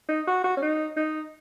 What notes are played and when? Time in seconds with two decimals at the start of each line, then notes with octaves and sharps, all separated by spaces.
0.09 D#4
0.27 F#4
0.44 F#4
0.57 C#4
0.62 D#4
0.96 D#4